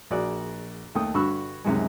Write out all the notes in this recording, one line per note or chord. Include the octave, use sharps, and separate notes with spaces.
A#1 F#4 G#4 D5 D6
D#2 A3 G5 D#6
G2 D3 F#4 B5 C#6 E6
C#2 F#2 C3 D#3 G#3